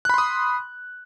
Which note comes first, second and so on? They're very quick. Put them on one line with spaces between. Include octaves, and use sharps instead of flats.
F#6 B5 C6 D#6